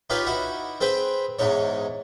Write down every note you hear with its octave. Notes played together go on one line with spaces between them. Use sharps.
D#4 F4 G4 B4 C#5 F5
D#4 E4 F#4
C4 G#4 B4 C5 G5
E2 G#2 D#4 C#5